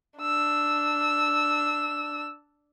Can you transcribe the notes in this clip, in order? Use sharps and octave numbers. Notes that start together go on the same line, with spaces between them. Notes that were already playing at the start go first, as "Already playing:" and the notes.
D4 E6